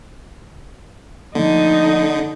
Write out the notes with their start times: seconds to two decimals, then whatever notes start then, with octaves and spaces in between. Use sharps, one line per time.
1.35 D3 F3 A3 A#3 D#4